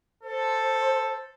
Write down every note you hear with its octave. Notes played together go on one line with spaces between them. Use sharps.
A4 C5